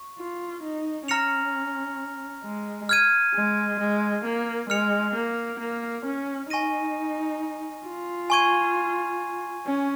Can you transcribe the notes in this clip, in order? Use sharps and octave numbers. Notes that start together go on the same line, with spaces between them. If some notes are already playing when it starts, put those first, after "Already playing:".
Already playing: C#6
F4
D#4
C#4 A#5 F6 A#6 C#7 F7
G#3
F6 G#6 D#7
G#3
G#3
A#3
G#3 F6 C#7 F7
A#3
A#3
C#4
D#4 G#5 C#6 A#6 D#7
F4
G#5 C#6 G#6 D#7
C#4